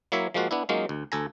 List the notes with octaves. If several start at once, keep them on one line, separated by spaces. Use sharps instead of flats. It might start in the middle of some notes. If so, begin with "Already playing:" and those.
F#3 A#3 E4 C#5 E5
F3 G#3 A#3 F4 F#4
B3 D4 E4
F#3 G#3 A#3 C#4 D#4 F4
D2
D2 A4 G#5 A#5